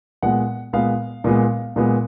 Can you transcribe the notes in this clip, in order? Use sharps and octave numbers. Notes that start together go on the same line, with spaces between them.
A#2 G#3 B3 F#5
A#2 G#3 B3 F5
A#2 G#3 B3
A#2 G#3 B3